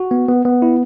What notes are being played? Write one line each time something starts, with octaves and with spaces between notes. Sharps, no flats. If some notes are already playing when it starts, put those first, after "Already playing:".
Already playing: F#4
B3
B3
B3
E4